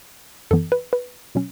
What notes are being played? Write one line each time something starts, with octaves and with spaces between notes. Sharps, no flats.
F#2 E3 B3 A4
B4
B4
B2 F#3 C#4